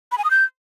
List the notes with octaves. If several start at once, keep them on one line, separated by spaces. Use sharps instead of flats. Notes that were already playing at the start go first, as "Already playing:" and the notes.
B5
G#5
D#6
G6